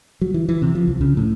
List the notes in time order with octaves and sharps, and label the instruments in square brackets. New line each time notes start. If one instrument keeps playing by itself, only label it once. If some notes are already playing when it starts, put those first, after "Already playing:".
[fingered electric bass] F#3
E3
E3
C3
F3
C2
C#3
A2